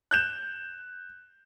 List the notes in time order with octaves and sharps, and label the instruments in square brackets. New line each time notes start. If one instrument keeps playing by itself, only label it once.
[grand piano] F#6 G6 E7